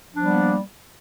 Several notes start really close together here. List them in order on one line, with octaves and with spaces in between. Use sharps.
F3 D4 B3 G3 A#3